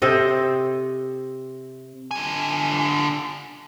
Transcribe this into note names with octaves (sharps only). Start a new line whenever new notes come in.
C3 C4 A4 D#5
D3 G#5